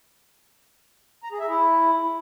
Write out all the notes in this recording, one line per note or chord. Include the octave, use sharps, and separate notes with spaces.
A#5
G#4
E5
E4